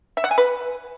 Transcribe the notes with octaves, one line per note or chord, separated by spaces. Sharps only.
E5
F#5
G#5
B4